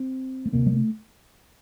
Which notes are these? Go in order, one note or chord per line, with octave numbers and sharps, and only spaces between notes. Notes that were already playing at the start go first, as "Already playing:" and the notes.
Already playing: C4
A3
D2 C3 A#3
G3
A3